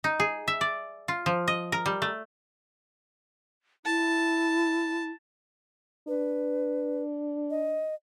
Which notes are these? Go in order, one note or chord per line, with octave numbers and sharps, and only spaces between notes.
D#4
G#4
E5
D5
F4
F3
D#5
A#4
G3
A3
E4 A5
D4 B4
D#5